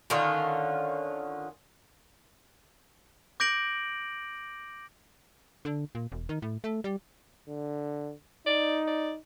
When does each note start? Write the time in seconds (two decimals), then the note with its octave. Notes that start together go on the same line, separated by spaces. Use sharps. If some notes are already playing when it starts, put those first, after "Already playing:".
0.10 D3 D#3 C#4 F4
3.40 D6 G6 A#6 D7 F#7
5.65 D3
5.95 A#2
6.12 E1
6.29 D#3
6.42 A2
6.64 A3
6.84 G3
7.48 D3
8.46 D#4 D5
8.87 D5